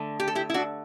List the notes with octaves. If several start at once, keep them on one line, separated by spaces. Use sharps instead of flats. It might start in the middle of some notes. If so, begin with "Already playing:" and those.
Already playing: D3 A3
G4
A4
E4 G4
E4
D4 F#4